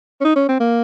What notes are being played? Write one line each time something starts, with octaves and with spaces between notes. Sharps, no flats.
C#4
D#4
C#4
C4
A#3